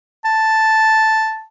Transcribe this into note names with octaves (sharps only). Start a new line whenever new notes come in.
A5